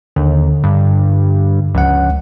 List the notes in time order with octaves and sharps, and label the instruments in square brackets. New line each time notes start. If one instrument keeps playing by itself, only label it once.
[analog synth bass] D#2 [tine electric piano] D3
[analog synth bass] G2
[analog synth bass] C#2 [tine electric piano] F3 F#5